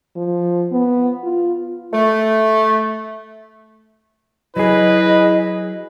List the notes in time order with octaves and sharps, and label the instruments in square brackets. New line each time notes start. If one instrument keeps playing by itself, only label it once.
[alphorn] F3
B3
F4
[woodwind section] A3
[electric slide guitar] F#3 G#4 [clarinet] E4 [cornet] B4 [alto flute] D#5